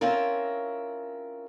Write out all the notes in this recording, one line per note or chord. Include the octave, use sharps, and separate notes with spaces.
C4 C#4 E4 F4 A#4